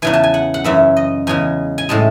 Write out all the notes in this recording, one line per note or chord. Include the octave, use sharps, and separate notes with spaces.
E2 C#3 E3 G#5
A5
G#5
F#5
F#5
F#2 C#3 E3 E5
D#5
E2 C#3 G#3 G#5
G#5
A2 G#3 A5